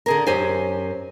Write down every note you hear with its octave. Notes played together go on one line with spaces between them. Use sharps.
D3 G#4 A#4
F#2 G4 C5 G#5